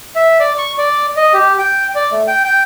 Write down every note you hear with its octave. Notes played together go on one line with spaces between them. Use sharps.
E5
D5
C#6
D5
D#5
G4
G5
D5
A3
G5
G5